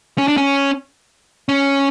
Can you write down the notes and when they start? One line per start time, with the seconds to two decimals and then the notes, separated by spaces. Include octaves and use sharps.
0.18 C#4
0.28 D4
0.37 C#4
1.49 C#4